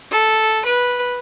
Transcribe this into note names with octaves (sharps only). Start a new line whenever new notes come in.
A4
B4